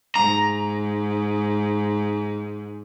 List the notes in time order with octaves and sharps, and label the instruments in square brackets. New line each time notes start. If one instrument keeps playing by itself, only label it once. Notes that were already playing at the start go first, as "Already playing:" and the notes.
[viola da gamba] G#2 [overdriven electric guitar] A#5